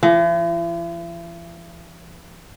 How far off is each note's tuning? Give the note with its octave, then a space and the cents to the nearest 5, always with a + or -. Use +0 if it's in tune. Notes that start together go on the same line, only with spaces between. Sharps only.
E3 +45